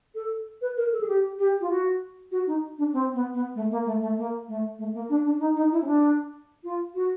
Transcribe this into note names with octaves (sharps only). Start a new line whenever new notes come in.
A4
B4
A#4
A4
G#4
G4
G4
F4
F#4
F#4
D#4
D4
C4
B3
B3
A3
A#3
A3
A3
A#3
A3
A3
A#3
D4
D4
D#4
D#4
E4
C#4
D4
F4
F#4